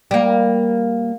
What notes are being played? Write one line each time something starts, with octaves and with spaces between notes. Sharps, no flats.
G3 A#3